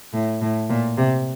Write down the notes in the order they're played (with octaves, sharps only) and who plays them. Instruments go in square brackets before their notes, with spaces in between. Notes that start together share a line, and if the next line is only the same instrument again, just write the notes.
[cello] A2
A2
A#2
C3